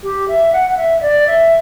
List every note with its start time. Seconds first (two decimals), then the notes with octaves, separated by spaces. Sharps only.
0.03 G4
0.28 E5
0.53 F#5
0.70 F#5
0.77 E5
0.98 E5
1.02 D5
1.27 E5